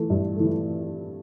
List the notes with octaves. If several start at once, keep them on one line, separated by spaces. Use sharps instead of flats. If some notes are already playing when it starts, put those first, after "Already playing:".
Already playing: E3 A3
G2
E3 A3